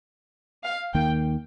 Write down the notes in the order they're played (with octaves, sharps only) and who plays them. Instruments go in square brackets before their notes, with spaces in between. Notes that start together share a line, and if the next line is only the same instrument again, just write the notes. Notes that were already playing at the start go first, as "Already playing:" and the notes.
[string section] F5
[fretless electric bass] D#2 D#3 A#3 [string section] G5